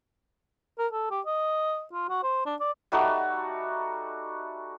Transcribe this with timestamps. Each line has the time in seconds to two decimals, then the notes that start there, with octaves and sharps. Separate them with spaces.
0.79 A#4
0.93 A4
1.11 G4
1.26 D#5
1.93 F4
2.09 F#4
2.23 C5
2.46 D4
2.60 D5
2.92 G3 A3 D#4 F#4